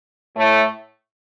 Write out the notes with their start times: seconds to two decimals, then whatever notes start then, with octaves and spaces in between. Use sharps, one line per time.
0.36 A2 A3